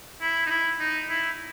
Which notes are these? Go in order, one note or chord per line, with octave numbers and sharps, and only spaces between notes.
E4
D#4
E4
D#4
E4